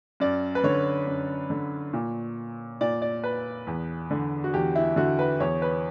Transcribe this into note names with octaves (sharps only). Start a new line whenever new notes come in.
F#2 D5
B4
D3 C#5
F#2
D3
A#2
A#2 D5
D5
B4
E2
D3
F#4
E2 G4
E4
D3 F#4
B4
E2 C#5
B4